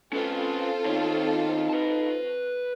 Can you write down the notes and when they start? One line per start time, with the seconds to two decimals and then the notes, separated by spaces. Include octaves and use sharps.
0.13 C4 C#4 F4 A4 B4
0.86 D#3 D#4 C#5
1.69 B4 A5